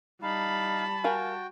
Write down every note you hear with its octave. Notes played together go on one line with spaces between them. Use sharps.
G3 D#4 F5 A5 B5
F#4 A#4 F5 G5 G#5